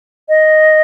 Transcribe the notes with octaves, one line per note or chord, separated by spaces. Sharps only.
D#5